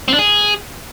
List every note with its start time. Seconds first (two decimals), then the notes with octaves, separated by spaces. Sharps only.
0.08 C4
0.13 D4
0.19 G#4